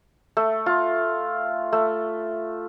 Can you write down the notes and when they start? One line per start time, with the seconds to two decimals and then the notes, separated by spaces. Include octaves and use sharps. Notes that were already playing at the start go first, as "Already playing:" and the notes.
0.37 A3
0.66 F4
1.73 A3